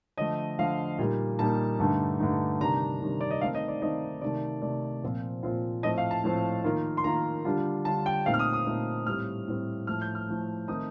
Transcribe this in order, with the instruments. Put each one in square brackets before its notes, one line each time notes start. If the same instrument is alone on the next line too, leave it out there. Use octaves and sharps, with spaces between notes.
[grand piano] D3 F3 A3 D#5
D3 F3 A3 F5
A#2 G3 A#3 D#4
A#2 G3 A#3 D#4 A5
G2 D3 A3 D#4
G2 D3 A3 D#4
C3 D#3 G3 D4 A#5
C3 D#3 G3 D4
D5
D#5
D#3 A3 C4 D#4 F5
D#5
D5
D#3 A3 C4 D#4 D#5
C3 D#3 A3 D5
C3 D#3 A3 D5
A#2 F3 C4 F4
A#2 F3 C4 F4
A2 F3 A3 C4 D#5
F5
A5
A2 F3 A3 C4
D#3 A#3 F4
C6
D#3 A#3 F4 A#5
D3 G3 D4 F4
D3 G3 D4 F4 A5
G5
A#2 A3 C4 D#4 F5
F6
D#6
D#6
A#2 A3 C4 D#4
A2 G3 C4 F6
A2 G3 C4
A2 F3 A3 F6
G6
F6
A2 F3 A3
D#3 A3 C4 D#4 D#6